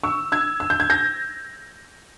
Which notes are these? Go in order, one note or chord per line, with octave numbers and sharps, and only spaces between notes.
C#6 E6
E6 G#6
E6
G6
G#6
G6 A#6